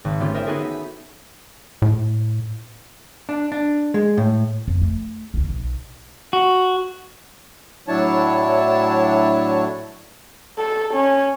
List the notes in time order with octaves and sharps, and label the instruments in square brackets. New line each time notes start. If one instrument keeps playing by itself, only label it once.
[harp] G#1
D3 A3 B3 C#4 F4 G4
A#4 C5 D#5 E5 G5
B3 D#4 F#4 G#4 A4 E5
B6
[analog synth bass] A2
[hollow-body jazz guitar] D4
D4
G#3
A2
[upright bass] F2
A3
D2 A#3
B1
[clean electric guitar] F#4
[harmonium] A2 F#3 D4 E4 C#5 A5
[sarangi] A4
C#4